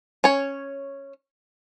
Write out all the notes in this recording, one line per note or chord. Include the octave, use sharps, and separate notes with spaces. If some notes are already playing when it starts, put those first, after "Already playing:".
C#4 C#5